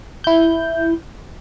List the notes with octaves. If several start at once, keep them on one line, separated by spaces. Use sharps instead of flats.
E4 G6